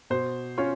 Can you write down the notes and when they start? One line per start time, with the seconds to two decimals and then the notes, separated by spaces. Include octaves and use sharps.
0.10 B2 C5
0.58 C#4 F4 C#5